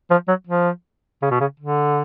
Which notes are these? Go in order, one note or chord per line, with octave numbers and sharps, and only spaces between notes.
F3
F#3
F3
C#3
B2
C#3
D3